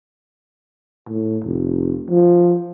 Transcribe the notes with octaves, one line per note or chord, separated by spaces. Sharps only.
A2
F1
F3